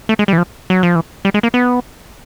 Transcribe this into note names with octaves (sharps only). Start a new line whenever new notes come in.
A3
G#3
G3
E3
F3
F#3
F3
E3
G3
G#3
A#3
B3